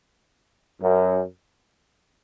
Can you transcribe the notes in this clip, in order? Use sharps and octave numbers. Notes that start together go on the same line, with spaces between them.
F#2